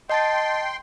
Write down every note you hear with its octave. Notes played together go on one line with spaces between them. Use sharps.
D#5 G5 A5 C6 A6